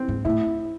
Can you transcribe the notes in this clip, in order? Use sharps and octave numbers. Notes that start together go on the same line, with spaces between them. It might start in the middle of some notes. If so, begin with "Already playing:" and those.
Already playing: C4
G#2
A2 E4